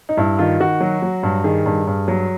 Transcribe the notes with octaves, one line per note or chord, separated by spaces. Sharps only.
D#4
G2 E4
D#3 F4
D#3 F#4
F#3
F#3
G2
D#3 G#4
G2
G2
F#3